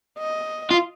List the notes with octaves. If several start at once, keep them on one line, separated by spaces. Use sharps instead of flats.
D#5
F4